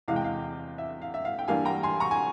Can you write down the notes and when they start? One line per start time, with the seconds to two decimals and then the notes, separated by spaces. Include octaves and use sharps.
0.08 E2 C3 E3 G#3 F5
0.16 G5
0.24 F5
0.78 E5
1.02 F5
1.14 E5
1.25 F5
1.39 G5
1.48 G2 E3 G3 A#3 F5 G#5
1.65 G5 A#5
1.83 G#5 C6
2.00 A#5 C#6
2.11 G#5